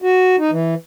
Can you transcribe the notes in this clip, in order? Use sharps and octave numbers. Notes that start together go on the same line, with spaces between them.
F#4
D#4
E3